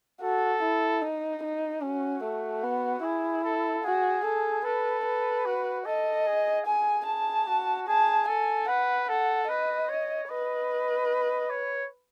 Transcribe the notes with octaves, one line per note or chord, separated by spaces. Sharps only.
F#4 A4
E4
D#4
D#4
C#4 F#4
A3
B3
E4 G#4
A4
F#4 G#4
A4
A4 B4
B4
F#4
A4 D#5
G#4
G#4 G#5
A5
F#4
G#4 A5
A4 G#5
B4 F#5
A4 F#5
B4 D#5
C#5
B4 D#5
C#5